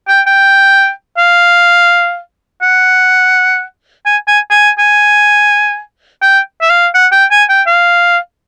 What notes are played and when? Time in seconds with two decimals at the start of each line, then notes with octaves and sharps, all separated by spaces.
0.09 G5
0.27 G5
1.18 F5
2.62 F#5
4.06 G#5
4.28 G#5
4.51 G#5
4.79 G#5
6.22 G5
6.62 E5
6.71 F5
6.95 F#5
7.13 G5
7.31 G#5
7.50 G5
7.67 F5